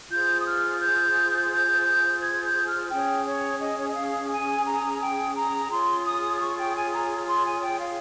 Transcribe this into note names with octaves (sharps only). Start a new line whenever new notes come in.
F4 G#4 C5 G6
D#6
F6
G6
G6
G6
G#6
G6
F6
C#4 G#4 C#5 G5
C#5
D#5
C#5
D#5
F5
G#5
A#5
G5
A#5
F4 G#4 C#5 C6
D#6
C#6
G5
G#5
A#5
C6
G#5
G5
F5